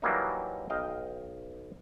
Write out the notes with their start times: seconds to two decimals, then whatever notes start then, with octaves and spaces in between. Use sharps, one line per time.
0.02 E3 F#3 G3 A#3 D4 D#4
0.70 B1 D#5 F5 G5